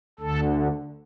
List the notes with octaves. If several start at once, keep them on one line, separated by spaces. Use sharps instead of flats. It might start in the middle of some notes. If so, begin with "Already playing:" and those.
D2 D3 A4